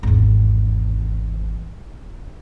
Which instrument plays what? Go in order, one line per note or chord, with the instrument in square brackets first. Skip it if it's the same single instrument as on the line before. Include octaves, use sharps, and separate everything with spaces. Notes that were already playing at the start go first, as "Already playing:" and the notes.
[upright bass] G#1 E2